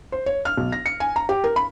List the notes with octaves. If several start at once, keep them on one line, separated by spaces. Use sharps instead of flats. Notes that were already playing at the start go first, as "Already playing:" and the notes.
C5
C#5
F6
B1
A#6
C#7
G#5
A#5
G4
A#4
B5